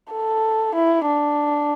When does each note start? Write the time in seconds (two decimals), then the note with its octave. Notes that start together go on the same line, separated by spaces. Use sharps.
0.13 A4
0.75 E4
1.06 D4